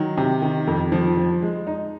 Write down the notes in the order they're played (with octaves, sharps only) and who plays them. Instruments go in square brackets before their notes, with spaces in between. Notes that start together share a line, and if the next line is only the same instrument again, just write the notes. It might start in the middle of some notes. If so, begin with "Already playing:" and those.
Already playing: [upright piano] D#3 F#3
C3
D#3
F2
F3
F3
G#3
D#4